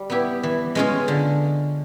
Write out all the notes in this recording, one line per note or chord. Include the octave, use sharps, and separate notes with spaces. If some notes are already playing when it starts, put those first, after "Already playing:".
Already playing: G3
B3 E4 G4
E3
G#3 C#4 F4 G#4
D3